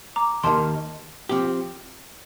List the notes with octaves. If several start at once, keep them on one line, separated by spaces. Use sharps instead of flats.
A#5 D6
D#2 D#3 A#3 A5 C6
F3 C4 G4